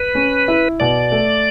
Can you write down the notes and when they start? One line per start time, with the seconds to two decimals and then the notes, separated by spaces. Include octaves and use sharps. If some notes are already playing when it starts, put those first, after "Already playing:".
Already playing: B4
0.15 C#4
0.48 E4
0.80 B2 D5
1.12 A3